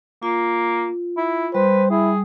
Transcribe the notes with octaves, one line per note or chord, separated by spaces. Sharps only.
A#3 F4
E4
G3 B4 C5
E4 G#4